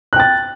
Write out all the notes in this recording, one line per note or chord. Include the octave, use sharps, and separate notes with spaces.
G5 F#6 A6